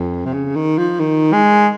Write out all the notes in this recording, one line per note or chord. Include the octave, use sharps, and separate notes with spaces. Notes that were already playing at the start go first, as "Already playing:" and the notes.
Already playing: F2
C3
C#3
D#3
F3
D#3
G#3